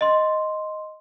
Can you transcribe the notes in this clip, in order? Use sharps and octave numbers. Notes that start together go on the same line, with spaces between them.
D#5 C6